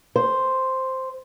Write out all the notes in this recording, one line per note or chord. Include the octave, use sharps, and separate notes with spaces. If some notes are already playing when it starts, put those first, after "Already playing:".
C5